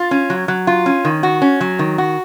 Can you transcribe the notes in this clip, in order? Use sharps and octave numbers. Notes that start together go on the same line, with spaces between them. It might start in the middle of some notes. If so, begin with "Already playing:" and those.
Already playing: F4
C#4
F#3
F#3
F4
C#4
D#3
F#4
C#4
F#3
D#3
F#4